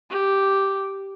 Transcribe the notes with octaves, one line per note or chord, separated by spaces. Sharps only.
G4